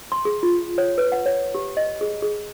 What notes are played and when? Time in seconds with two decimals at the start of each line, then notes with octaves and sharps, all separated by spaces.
0.12 C6
0.25 G#4
0.43 F4
0.78 C#5
0.98 B4
1.12 F#5
1.26 C#5
1.55 G4
1.77 D#5
2.01 G#4
2.22 G#4